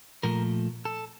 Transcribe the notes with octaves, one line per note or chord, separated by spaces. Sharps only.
A#2 F3 A3 A#4
A4